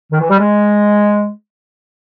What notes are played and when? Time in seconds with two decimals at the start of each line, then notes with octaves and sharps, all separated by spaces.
0.12 D#3
0.21 E3
0.30 G3
0.39 G#3